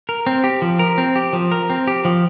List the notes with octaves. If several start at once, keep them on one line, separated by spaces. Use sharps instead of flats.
A#4
C4
G4
F3
A#4
C4
G4
F3
A#4
C4
G4
F3